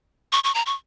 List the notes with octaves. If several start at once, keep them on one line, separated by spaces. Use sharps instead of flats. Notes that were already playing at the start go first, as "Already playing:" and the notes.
C#6
C#6
A#5
C#6